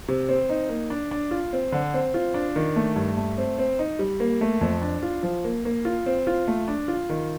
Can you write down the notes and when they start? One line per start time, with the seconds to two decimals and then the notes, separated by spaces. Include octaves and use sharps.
0.08 C3
0.29 C4
0.50 D#4
0.69 A#3
0.90 D4
1.11 D4
1.31 F4
1.53 C4
1.72 D3
1.94 C4
2.14 F4
2.34 D4
2.56 D#3
2.76 A3
2.96 G2
3.17 A3
3.38 C4
3.59 C4
3.79 D#4
3.99 G3
4.20 A#3
4.41 A3
4.61 F2
4.82 D4
5.03 F4
5.23 F3
5.44 A#3
5.65 A#3
5.85 F4
6.06 C4
6.27 F4
6.48 A3
6.68 D4
6.88 F4
7.09 D#3